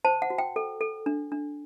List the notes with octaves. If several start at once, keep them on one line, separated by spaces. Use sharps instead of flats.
C5 A5
F#5
F#4
G5
A4
A4
D4
D4